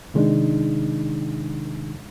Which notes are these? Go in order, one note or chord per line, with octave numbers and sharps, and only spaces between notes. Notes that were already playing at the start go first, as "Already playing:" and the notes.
C3 D#3 G#3 D4 D#4